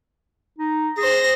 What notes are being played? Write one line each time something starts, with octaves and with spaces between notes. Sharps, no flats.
D#4
G#4 C5 A#6